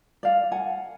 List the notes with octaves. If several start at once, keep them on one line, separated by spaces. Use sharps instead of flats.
D5 F5
F#5 G#5